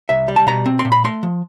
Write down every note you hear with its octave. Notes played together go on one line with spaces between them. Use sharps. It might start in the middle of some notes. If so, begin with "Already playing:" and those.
C2 E5
G3
A5
B2 A#5
C4
C6
A#2
B5
A3 C6
F3